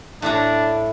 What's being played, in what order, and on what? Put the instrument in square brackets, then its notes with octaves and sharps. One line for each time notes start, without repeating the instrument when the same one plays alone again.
[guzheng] A2 E4 A#5 [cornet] D4